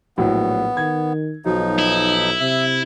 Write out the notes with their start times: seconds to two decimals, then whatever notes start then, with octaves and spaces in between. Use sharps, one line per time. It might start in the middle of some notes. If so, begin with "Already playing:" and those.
0.18 A#1 A2 F#3 B3
0.77 D#3 G#6
1.45 B1 F3 F#3 D#4
1.79 E4
2.40 C3 E5